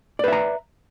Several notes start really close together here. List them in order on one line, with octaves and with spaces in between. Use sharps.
D5 B4 E5 A#5